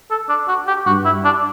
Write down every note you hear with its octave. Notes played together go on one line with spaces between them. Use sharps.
A4
D4
F#4
G4
G2 F#4
E4
D4